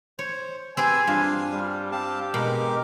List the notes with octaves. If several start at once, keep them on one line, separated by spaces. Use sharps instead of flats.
C5 C#5
C4 G4 G#4 B4 C5 G#5 E6
G2 D4 F4 F5
G3
C4 G4 F5 A5
B2 G#3 A#4 D6